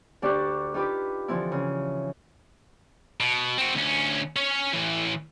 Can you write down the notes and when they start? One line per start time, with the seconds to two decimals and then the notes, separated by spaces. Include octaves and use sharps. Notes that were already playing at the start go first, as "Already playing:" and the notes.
0.22 D2 D4 G4 D5 C#6 F#6
0.74 D#4 F4 G4 B4 D6
1.28 D3 E3 F3 C4 E4
1.52 C#3
3.20 B2
3.58 C4 F#4
3.75 D2 C#4
4.36 C#4 C#5
4.73 A2 E3